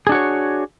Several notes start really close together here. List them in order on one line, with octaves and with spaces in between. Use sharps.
G#4 D4 F#4 C#5